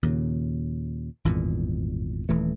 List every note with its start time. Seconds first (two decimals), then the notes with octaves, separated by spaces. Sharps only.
0.03 D#2 A#2 C#3
1.25 G#1 E2 G2 A#2
2.29 D#1 E3 A3